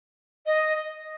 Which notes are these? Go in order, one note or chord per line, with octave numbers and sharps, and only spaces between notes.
D#5